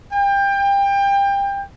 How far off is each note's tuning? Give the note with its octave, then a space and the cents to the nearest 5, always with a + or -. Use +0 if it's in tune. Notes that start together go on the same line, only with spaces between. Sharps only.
G5 +25